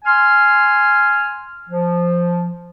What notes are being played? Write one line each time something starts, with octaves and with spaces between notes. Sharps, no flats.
G#5 C6 F6
F3